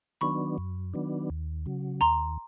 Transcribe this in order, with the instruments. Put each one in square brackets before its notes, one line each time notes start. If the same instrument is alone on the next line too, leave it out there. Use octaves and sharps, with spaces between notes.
[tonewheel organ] D#3 F#3 B3 D4 [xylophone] B5 C#6
[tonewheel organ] F#2
D#3 F#3 B3 D4
D#2
C#3 F#3
[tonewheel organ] D#2 [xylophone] A#5 C6